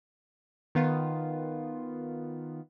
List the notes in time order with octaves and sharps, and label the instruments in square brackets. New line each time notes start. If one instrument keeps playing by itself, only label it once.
[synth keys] D#3 B3 F4